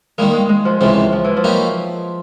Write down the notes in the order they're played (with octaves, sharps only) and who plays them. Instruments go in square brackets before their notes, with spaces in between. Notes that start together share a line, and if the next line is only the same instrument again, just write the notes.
[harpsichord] D#3 G3 A#3 [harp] G#3
[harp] G#3
G#3
F3
[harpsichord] C#2 C3 E3 [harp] F3
[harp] F3
E3
F3
[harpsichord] F#3 A#3 D#4 G4 B4